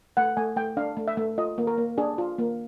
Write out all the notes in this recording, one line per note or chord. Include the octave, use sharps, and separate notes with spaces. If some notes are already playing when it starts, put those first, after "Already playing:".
A3 F#5
A3 G#5
A3 G5
D4 F5
A3
E5
A3
F4 D#5
A#3
A#4
A#3
D4 G#4
F4
A#3